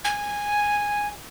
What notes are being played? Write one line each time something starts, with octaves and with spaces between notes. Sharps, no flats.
G#5